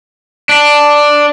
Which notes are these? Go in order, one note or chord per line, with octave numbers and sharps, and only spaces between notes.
D4